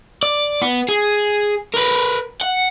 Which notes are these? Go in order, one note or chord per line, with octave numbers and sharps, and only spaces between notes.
D5
B3
G#4
A#4 B4
F#5